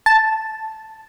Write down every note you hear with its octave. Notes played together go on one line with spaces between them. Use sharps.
A5